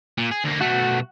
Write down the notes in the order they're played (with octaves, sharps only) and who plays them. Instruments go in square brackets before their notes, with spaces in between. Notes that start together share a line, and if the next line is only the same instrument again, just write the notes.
[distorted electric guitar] A#2
G#4
D2 A#3
[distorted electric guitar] B1 A3 [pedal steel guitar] F#4